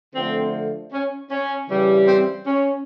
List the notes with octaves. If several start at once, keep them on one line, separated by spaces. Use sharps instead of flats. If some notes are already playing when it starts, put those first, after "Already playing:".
D3 F3 A3 C4
C#4
C#4
C#3 E3 G3
C4
C#4